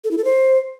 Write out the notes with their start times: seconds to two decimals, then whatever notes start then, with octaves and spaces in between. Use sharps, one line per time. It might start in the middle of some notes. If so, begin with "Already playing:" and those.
0.04 A4
0.11 E4
0.18 A4
0.25 C5